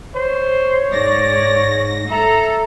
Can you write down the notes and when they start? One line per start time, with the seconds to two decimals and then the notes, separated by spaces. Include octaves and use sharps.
0.15 C5 C#5
0.92 G#2 D5 A#6
2.11 A4 E5 A#5